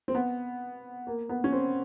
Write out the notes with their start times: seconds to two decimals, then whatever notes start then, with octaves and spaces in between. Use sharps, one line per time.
0.08 C4
0.15 B3
1.07 A#3
1.29 B3
1.44 C#4
1.52 C4